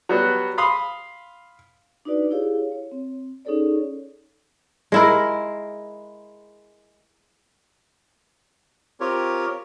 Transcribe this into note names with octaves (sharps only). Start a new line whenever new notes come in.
F#3 G3 B3 F#4
F5 B5 C6 D#6
D4 D#4 F#4 B4 D5
E4 G4 G#4 C#5 F5
C#5
C4
C#4 D#4 G#4 A4 C#5 D5
G#3 E4 A#4
C4 F4 G4 A#4 C#5